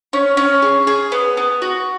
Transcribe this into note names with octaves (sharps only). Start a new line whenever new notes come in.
C#4
C#4
G#4
G#4
B3
B3
F#4